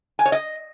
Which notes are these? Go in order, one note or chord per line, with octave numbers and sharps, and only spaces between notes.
G#5
C#5
D#5